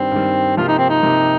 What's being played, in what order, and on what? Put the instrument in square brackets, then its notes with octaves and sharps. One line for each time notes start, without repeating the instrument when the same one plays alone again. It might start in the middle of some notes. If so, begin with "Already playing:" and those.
Already playing: [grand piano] G2 D#3 G3 [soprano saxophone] C4
[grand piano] G2 D#3 G3
[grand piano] C3 F3 A#3 G4 [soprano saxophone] F4
[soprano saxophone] D#4
C4
D#4
[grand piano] C3 F3 A#3 G4